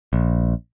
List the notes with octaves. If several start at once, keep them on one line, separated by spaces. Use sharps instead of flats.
A#1